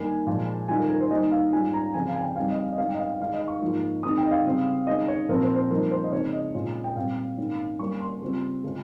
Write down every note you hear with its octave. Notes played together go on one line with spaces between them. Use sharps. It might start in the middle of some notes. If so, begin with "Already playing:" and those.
Already playing: G2 D#3 A#3 G#5
A#2 F3 G#3
D#3 G3 C#4 F4 G#5
A#4
A#4
C5
D#3 G3 A#3 D#4 D#5
F5
G#2 G3 C#4 F4 G#5
A#5
C#3 F3 C4 G#5
F5
G#5
G5
G2 G3 C4 D#4 F5
D#5
D#5
G#2 G3 C#4 F5
G5
D#5
F5
F5
D#3 G#3 D#4 F5
D#5
C#6
G#2 F3 A#3 F4
D#3 G#3 C4 D#4 D#6
G5
D#5
F5
C#3 G3 C4
D#3 G#3 C#4 D#5
C#5
A#2 F3 C4 A#4
C5
C5
G2 F3 A#3 D#4 A#4
C5
D#5
C#3 G#3 C4 D#4 C#5
D#5
A#2 G#3 C#4 F4
G5
A#2 G3 C4 F5
G#2 D#3 A#3 C#4
G2 G3 A#3 C#4 C#6
C6
C#3 G3 C4 F4
C#3 G#3 C#4 F4